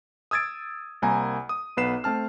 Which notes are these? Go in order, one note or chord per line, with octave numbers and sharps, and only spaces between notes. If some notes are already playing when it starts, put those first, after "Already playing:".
D#6 E6 G#6 A6 D7
C2 A#3 C4 G#5 A#5
D#6
B1 B3 B4 C7 E7
A3 C4 A5 F6